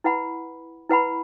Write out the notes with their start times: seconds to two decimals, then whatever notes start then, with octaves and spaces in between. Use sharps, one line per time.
0.04 E4 B4 F#5 B5
0.89 E4 B4 F#5 B5